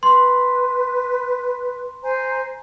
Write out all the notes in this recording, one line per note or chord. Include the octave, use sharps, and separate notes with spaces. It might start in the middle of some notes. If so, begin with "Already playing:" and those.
B4 C6
C5 G#5 A#5